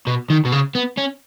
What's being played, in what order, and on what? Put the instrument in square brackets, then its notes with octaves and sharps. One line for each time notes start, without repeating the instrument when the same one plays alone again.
[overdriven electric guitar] B2
D#3
B2
C#3
B3
C#4